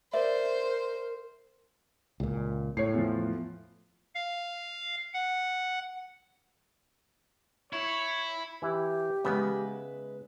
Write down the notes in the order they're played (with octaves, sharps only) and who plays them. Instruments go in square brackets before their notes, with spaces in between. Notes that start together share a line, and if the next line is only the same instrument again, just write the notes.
[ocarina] A#4 [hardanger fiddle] C5 [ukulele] D5 E5
[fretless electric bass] C#2 A#2
[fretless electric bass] A2 [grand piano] C#5 C7
[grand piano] E2 F3
[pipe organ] F5
F#5
[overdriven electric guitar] E4 [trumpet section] C#5
[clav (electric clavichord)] E3 E4 [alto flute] G4
[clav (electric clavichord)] C#3 B3 [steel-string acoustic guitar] G#3 B4 E5